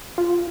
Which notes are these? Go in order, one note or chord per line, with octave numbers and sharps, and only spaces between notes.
F4